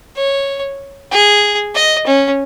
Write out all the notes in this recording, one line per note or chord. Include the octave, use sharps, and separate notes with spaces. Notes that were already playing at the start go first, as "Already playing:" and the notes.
C#5
G#4
D#5
C#4